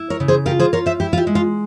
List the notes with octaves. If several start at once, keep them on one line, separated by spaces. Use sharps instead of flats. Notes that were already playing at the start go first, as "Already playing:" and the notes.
Already playing: E4
A#4 C#5
C#3
G#4 C5
F4 G4 A#4
G#4 C5
F4 A#4 C#5
C5 E5
E4 G4
F4
G4
G#3
F4